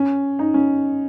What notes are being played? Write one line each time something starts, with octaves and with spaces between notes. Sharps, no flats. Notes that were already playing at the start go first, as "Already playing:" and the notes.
Already playing: C#4
D#4
C#4